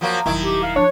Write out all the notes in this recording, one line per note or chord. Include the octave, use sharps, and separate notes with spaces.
F3 F#3 A#3
D#1 D#3 F#3 E4
G4
F5
F3 D4 E4 C#5